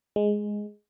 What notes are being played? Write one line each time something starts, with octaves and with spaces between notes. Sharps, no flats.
G#3